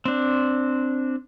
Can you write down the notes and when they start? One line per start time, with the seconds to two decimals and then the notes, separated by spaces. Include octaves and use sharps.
0.05 C4 D4